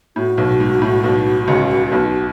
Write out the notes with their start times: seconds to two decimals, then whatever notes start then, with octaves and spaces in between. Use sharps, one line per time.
0.16 A2 F#4
0.38 B1 B2
0.60 G#2
0.82 A2
1.04 B1 B2
1.48 C#2 C#3
1.92 B1 B2